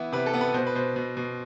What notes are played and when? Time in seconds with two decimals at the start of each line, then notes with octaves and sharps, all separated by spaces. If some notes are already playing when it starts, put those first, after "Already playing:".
Already playing: E3 B3 E4
0.13 C3 B4
0.26 A4
0.34 B3
0.41 B4
0.54 B2 C5
0.67 B4
0.75 B2 C5
0.96 B2
1.17 B2